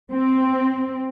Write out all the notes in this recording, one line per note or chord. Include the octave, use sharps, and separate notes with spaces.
C4